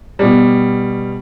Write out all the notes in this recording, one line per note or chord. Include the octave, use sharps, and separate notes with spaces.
B2 G3